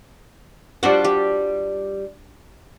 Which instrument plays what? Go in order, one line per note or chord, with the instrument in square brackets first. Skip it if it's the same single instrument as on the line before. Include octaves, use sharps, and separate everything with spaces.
[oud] G3 F4 F#4 [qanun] D4 C5 F#5
[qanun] G4